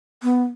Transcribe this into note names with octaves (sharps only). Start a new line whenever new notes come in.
B3